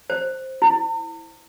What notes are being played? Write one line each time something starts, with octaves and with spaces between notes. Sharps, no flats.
C5
E4